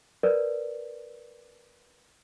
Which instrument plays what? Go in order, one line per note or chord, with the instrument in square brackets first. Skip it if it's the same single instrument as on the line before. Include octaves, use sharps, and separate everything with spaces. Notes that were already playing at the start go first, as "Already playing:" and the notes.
[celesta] A#4 B4 D5